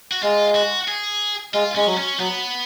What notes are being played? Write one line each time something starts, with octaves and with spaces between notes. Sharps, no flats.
F#4
G#3 F4
F#4
G#4
G#3 F4
G#3 C#4
F#3
C#4
F#3 B3